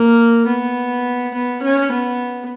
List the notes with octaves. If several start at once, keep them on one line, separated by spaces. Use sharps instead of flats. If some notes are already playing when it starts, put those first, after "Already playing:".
Already playing: A#3
B3
B3
C#4
B3